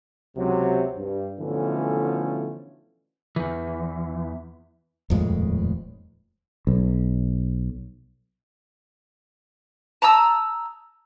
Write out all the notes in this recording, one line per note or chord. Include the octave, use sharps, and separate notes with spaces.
C#2 C3 F#3
G2
B2 D3 E3 F3 A3 C#4
E2 E3
D#1 F2 A2 G#3
B1
A5 A#5 D#6 E6